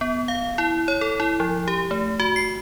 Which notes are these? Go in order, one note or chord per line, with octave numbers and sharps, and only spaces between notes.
B3
F5
E4
C#5
A4
E4
F3
G4
A3
F#4
C7